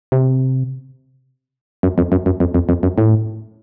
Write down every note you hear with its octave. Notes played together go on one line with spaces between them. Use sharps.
C3
F#2
F2
F#2
F#2
F2
F2
F2
F#2
A2